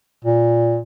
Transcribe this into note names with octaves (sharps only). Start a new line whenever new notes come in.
A#2